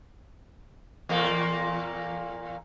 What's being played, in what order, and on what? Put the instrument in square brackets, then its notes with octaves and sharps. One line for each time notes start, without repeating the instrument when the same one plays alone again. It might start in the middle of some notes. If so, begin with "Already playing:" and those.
[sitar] E2 A#2 A#3